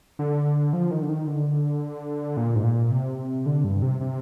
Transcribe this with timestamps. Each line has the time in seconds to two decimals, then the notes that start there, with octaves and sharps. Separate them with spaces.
0.19 D3
0.73 F3
0.91 D#3
1.02 D3
1.09 D#3
1.27 D3
2.37 A#2
2.56 G#2
2.64 A#2
2.91 C3
3.46 D3
3.64 G2
3.82 C3
4.01 C3